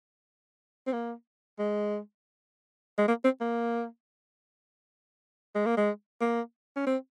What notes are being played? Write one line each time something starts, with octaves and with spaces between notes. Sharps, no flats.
C4
A#3
G#3
G#3
A#3
C4
A#3
G#3
A#3
G#3
A#3
C#4
C4